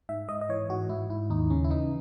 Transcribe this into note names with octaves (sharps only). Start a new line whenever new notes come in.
G#2 E5
G#2 D#5
D#5
E3 C#5
G#2 F#4
G#2 E4
G#2 E4
D#2 D#4
C#3 C#4
E4
E3 D#4